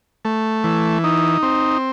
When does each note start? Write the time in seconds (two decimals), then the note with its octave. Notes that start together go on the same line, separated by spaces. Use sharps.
0.25 A3
0.64 E3
1.04 D#4
1.43 C4